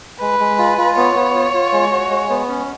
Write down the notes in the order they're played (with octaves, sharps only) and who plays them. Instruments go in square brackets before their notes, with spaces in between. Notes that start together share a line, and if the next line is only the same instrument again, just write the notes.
[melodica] G#3 [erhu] B4
[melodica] G#3
F4
F4
[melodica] B3 [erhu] C#5
[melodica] B3
F4
F4
G#3
F#4
G#3
B3
C#4